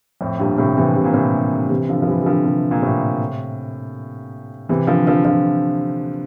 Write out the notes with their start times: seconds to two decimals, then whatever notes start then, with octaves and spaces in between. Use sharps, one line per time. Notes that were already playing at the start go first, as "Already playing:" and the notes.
0.21 F2 A2
0.39 G2 A#2
0.58 A2 C3
0.77 C3 E3
0.96 C3
1.04 A#2
1.14 A2 C3
1.70 C3 E3
1.89 D3 F3
2.02 F3
2.07 E3 G3
2.22 G3
2.26 D3 F3
2.45 C3 E3
2.71 A#2
2.82 A2 C3
4.69 C3 E3
4.87 D3 F3
5.07 D3 F3
5.25 D3 F3